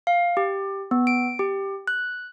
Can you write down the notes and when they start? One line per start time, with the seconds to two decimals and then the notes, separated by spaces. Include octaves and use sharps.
0.07 F5
0.37 G4
0.91 B3
1.07 D7
1.39 G4
1.88 F#6